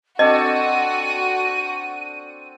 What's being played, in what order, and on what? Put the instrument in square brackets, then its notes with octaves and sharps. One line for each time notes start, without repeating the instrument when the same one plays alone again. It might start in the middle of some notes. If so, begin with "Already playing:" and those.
[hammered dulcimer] C4 D4 A4 [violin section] F#4 [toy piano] D#5 [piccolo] D#7